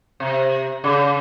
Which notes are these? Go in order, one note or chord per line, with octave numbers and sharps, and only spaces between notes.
C3
C#3